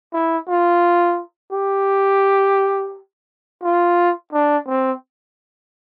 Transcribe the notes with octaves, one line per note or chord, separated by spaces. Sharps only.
E4
F4
G4
F4
D4
C4